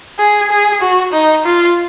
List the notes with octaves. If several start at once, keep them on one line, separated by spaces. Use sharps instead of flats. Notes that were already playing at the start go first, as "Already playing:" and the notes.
G#4
G#4
F#4
D#4
F4